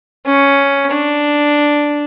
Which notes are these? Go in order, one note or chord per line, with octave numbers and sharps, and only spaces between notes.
C#4
D4